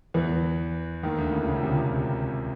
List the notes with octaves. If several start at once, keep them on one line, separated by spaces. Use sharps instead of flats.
E2 E3
D#2 D#3
D2 D3
C#2 C#3
C#2 C#3
C3
C3